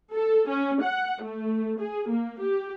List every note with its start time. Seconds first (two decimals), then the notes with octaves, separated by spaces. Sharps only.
0.13 A4
0.49 C#4
0.82 F#5
1.22 A3
1.79 G#4
2.09 A#3
2.40 G4